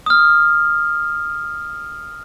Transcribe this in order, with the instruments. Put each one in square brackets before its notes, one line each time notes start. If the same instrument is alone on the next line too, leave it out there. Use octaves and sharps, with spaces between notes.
[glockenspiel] D#6 F6